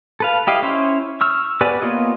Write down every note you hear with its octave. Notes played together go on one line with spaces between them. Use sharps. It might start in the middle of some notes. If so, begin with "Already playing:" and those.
A4 B4 F5
E4 G4 D#5 F5
C#4 E4 C5 C#5
C#6 E6 F6
B3 G4 B4 D5 G#5
A#3 B3 F4 C#5 D#5